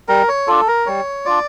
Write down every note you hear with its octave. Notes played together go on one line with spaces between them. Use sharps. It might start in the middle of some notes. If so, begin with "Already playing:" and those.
G3 A#4
C#5
D4 F4 A4
A#4
G3 C#5
D4 F4 D5